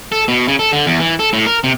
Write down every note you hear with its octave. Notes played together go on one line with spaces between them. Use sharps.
A4
B2
C#3
A4
D3
E2
E3
A4
A2
A#4
C3